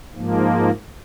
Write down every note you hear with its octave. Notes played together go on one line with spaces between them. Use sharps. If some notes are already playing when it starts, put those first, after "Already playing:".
G#2 F3 A#3